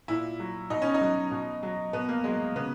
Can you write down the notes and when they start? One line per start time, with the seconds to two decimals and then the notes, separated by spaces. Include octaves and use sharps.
0.08 A#2 E4
0.39 F#3
0.70 B2 D#4
0.82 C#4
0.94 D#4
1.01 F#3
1.31 B2
1.63 F#3
1.93 B2 B3
2.09 A#3
2.24 F#3 G#3
2.56 C#3 B3